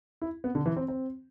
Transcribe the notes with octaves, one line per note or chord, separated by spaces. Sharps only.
E4
B3
D3
E3
C4
C4